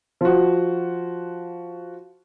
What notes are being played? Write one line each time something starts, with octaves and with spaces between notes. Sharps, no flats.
F3 F#4